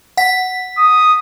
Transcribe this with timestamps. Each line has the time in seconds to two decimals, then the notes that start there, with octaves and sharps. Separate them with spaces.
0.17 F#5 B6
0.78 D#6